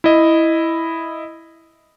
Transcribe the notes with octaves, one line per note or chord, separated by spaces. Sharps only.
E4 D#5